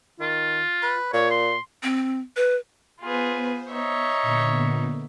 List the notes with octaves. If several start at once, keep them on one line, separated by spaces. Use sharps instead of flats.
D#3 F4
B4
A#2 C#5
C6
C4
B4
B3 F4 G#4 B4 C5
D#4 C#5 E5
A#2 D3 B3